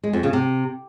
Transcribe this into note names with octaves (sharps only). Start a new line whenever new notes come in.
G#3
F2
C#3
C3